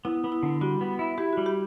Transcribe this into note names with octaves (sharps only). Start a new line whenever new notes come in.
B3 E4
B3
E4
D3
G3 F#4
B3
E4
E4 G4
G3 F#4
G4